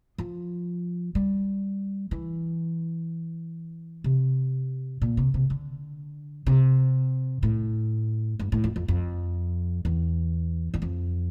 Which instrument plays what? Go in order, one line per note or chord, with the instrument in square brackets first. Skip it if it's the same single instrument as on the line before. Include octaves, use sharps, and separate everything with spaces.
[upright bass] F3
G3
E3
C3
A#2
C3
C3
D3
C3
A2
G2
A2
F2
F2
F2
E2
E2
F2